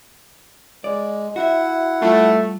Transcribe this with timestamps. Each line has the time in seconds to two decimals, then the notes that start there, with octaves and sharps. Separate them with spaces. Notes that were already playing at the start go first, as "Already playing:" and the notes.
0.84 G#3 D5
1.36 E4 F#4 E5 F#5
2.02 G3 A3 F4